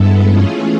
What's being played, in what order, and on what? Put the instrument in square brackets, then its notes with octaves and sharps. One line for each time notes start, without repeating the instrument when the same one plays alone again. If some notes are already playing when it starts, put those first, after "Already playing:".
Already playing: [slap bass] G2 [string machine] G#3 B3 E4 A4
[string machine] E3 A3 C#4 F4 G#4